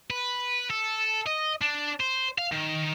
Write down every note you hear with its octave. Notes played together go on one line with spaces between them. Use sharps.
B4
A4
D#5
D4
C5
F5
D#3